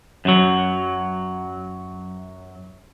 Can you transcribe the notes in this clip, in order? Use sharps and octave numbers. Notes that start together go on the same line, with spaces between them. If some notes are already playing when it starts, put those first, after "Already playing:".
F#2 F#3